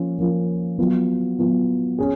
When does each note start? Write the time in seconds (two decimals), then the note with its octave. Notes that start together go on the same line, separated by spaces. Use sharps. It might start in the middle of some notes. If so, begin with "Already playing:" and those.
Already playing: F3 A#3 C#4 F4
0.18 F3 A#3 C#4 F4
0.78 F#3 B3 F4
1.39 F#3 B3 F4
1.98 C#4 G#4